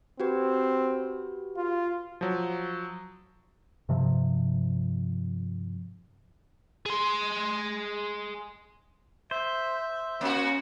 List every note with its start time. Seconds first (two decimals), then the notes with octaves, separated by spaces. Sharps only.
0.20 C4 F#4 G4 B4
1.57 F4
2.21 F3 F#3
3.89 G2 C3 F3
6.86 G#4 C6
9.31 C5 E5
10.21 A#3 C#4 F#4